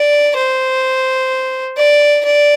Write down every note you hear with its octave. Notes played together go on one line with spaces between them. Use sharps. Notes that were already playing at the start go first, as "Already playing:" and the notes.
Already playing: D5
C5
D5
D5